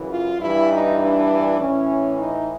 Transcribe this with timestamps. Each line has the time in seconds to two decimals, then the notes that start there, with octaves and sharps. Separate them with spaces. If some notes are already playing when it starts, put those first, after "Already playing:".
Already playing: F#2 C#3 E3
0.10 F4
0.39 G2 E3 E4
0.69 D#4
0.98 D4
1.58 A2 E3 C#4
2.17 D#4